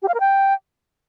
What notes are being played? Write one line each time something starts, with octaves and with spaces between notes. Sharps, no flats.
G4
F5
A#4
G5